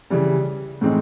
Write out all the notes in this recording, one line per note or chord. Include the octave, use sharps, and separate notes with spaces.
C#3 E3 G3
A2 E3 G#3 C4 D#4